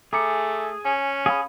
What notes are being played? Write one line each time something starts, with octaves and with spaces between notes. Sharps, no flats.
A3 G#4 A#5 D6 C#7
C#4 G#5
G#4 F5 B5 D#6